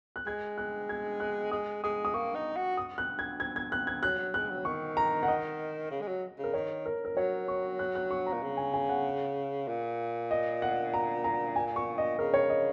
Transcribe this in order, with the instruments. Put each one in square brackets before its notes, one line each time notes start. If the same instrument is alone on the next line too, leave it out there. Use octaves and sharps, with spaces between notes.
[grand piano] F#6
[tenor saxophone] G#3 [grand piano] G#6
[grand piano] F#6
G#6
F#6
[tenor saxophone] G#3 [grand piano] D#6
[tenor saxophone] G#3 [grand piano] D#6
[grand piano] D#6
[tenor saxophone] A#3 [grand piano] C#6
[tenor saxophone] D#4
F#4
[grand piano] D#6
F#6
G#6
G#6
G#6
F#6
G#6
[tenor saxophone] F#3 [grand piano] F#6
[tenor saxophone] F#3
[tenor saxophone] G#3 [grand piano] F#6
[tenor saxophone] F#3
[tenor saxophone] D#3 [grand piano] C#6
[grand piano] A#5
F#5
D#5
[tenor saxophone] C#3
G#3
F#3
C#3
[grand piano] A#4
[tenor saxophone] D#3 [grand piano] C#5
[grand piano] A#4
A#4
[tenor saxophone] F#3 [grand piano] C#5
[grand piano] C#6
F#6
F#6
C#6
A#5
[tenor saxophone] A#2
C#3
[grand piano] G#5
G#5
F#5
[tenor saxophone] A#2
[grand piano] D#5
F#5
A#5
A#5
G#5
C#6
D#5
[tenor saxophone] C#3 [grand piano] A#4
[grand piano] C#5
D#5